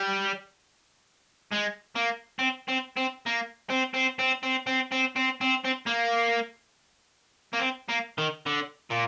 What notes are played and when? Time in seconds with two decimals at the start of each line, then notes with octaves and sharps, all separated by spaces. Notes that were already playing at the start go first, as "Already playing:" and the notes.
Already playing: G3
1.52 G#3
1.96 A#3
2.39 C4
2.68 C4
2.97 C4
3.26 A#3
3.70 C4
3.94 C4
4.19 C4
4.43 C4
4.67 C4
4.92 C4
5.16 C4
5.41 C4
5.65 C4
5.87 A#3
7.53 A#3
7.60 C4
7.89 A#3
8.18 D#3
8.46 D3
8.90 A#2